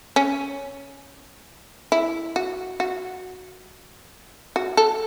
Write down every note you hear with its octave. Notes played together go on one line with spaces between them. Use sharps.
C#4
E4
F#4
F#4
F#4
A4